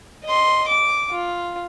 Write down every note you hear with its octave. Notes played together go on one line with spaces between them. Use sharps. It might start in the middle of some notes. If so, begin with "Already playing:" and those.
D#5 C6
D6
F4